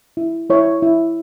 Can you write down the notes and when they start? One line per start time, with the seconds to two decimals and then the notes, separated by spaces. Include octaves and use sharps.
0.17 E4
0.50 E4 C#5
0.82 E4